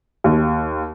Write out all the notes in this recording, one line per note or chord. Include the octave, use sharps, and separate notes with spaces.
D#2